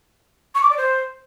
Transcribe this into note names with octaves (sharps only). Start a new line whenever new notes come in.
C#6
D6
D5
C5